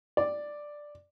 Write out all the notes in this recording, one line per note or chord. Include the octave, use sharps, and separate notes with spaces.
D5